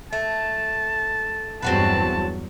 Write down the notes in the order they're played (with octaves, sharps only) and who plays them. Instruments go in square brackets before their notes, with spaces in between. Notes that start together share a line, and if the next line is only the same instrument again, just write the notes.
[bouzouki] A3 [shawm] A5
[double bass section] E2 G2 F#3 [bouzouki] C4 F#4 B4 [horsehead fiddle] A5